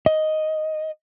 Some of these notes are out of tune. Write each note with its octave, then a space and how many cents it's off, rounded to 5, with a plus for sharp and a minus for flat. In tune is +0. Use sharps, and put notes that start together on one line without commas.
D#5 +5